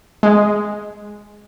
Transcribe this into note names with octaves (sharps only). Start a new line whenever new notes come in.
G#3